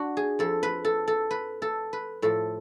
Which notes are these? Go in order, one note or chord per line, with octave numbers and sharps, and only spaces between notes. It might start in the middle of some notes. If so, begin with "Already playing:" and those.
Already playing: D4 F#4
G#4
F2 F3 A4
B4
A4
A4
B4
A4
B4
A2 F3 A4